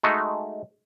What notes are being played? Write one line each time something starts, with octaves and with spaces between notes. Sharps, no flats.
G#3 A3 D#4 F#4